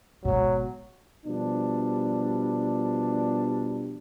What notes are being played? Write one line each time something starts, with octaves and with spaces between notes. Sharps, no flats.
G#1 B2 F#3
B2 F3 G3 D4